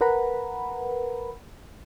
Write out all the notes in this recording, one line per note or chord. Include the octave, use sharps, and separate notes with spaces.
A#4 B4 F#5 A#5 B5